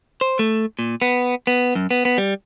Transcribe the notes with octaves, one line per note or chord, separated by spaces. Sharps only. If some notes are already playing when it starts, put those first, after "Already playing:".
C5
A3
A#2
B3
B3
F#2
B3
B3
G3